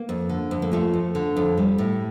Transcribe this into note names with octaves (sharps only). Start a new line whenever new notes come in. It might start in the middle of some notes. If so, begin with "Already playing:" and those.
Already playing: A#3
F2
D3
F2
A#3
F3 A3
F2
D3
F2
G3
A2